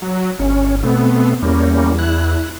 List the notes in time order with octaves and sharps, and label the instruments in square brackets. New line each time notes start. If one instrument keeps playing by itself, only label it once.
[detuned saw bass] F#3
[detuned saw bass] G1 [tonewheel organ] C#4
[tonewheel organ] B2 A3 C4 [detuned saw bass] B3
[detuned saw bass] E2 [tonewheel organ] G3 A#3 C#4
[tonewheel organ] E4 F#6